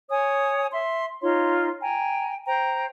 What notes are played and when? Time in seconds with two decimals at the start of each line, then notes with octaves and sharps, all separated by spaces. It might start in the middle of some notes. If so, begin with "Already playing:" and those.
0.09 C#5 G#5 D#6
0.72 E5 C6
1.21 D#4 F4 C#5 C6
1.81 G5 G#5 A#5
2.46 C5 G5 A#5